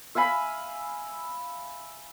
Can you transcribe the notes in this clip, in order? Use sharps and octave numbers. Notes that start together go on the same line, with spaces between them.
E5 F5 G#5 B5